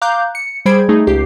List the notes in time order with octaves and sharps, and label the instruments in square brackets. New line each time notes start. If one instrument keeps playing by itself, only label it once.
[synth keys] F5 A#5 D6 F#6 G6
C#7
G3 G#4 C5 B5 G#6 D7
A3 D#4 G#4
C#2 G4 C7